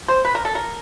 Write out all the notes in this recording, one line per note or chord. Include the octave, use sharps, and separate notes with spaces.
C5
B4
A#4
A4
A#4